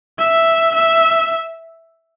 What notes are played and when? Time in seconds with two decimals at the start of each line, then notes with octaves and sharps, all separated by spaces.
0.18 E5
0.74 E5